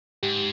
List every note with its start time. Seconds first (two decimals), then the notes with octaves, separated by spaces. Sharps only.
0.23 G#2 G4